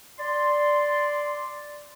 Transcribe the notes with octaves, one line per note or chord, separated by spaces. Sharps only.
D5 C6